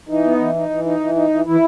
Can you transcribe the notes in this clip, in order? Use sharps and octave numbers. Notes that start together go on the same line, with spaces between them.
E3 D#4
B3
E3
D#4
E3
D#4
E3
D#4
E3
E3 E4